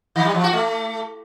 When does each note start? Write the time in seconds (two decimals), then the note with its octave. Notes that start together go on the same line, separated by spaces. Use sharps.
0.16 D#3
0.25 G3
0.34 F3
0.44 F#4
0.53 A3